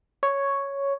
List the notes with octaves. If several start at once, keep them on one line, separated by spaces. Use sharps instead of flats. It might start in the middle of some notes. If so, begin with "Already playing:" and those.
C#5